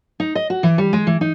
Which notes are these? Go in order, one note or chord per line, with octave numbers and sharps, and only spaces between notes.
D#4
D#5
F#4
E3
G3
G#3
E3
D#4